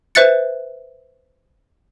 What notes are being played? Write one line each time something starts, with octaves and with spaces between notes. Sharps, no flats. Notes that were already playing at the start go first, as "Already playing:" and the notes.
B4 C5 E5 F#6 A6 C#7